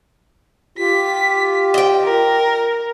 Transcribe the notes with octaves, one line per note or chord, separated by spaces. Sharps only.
F4 G4 B6
D#5 G5
A#4